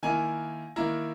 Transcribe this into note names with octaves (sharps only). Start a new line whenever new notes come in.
D#3 A#3 E4 G#5
D#3 A#3 E4 A#5